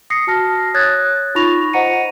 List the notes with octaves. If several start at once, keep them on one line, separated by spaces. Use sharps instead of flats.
D#6 A#6 C7 C#7
F#4 A5 F6 A#6
C#5 D#6 F#6 G#6 A6
D#4 F4 B5 C#6 A#6 F7
C5 D#5 F#5 A#5 C#7 D#7